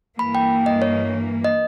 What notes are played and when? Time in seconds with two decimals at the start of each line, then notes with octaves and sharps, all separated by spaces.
0.18 G2 E3 A#3 B5
0.35 G5
0.66 D#5
0.82 C#5
1.45 D#5